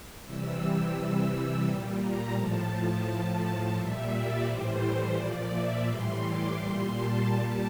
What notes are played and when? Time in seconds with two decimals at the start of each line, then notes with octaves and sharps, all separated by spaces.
0.24 C3 E3 G3 E6
0.59 E6
0.94 C3 E3 G3 E6
1.29 E6
1.64 A#2 G3
2.00 A#5
2.34 A2 F3 A5
3.04 A2 F3 A5
3.74 A#2 G3 E5
4.11 D5
4.45 A2 E3 G3 C5
4.81 C5
5.15 A#2 F3 D5
5.50 E5
5.85 A2 E3 G3 C6
6.20 D6
6.56 A#2 G3 C6
6.91 A5
7.25 A#2 G3 A5